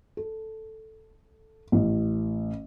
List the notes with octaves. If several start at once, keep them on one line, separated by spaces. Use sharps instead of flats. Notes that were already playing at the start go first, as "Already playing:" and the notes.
A4
A1